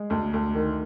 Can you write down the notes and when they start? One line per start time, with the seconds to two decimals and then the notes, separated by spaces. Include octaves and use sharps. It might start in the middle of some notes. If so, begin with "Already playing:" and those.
Already playing: G#3
0.10 D2
0.33 D2
0.55 D#3